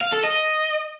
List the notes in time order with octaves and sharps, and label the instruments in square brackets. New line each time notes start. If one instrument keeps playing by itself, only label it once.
[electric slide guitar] F5
A4
D#5